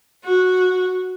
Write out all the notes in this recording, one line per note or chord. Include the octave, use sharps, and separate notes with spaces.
F#4